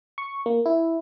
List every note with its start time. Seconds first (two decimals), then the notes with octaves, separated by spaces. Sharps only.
0.18 C#6
0.46 A#3
0.66 E4